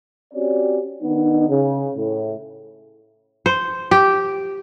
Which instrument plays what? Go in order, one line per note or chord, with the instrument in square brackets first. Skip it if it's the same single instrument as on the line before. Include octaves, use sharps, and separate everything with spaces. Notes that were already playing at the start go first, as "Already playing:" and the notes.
[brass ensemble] C4 C#4 F#4 G4 C#5 D5
D#3 B3 D4 D#4
C#3
A2
[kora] C5
G4